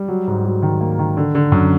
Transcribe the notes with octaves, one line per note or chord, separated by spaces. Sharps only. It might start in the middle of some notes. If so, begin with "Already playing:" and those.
Already playing: G3
F#3
G#2
F#3
D#3
A#3
D#3
D3
D3
F#2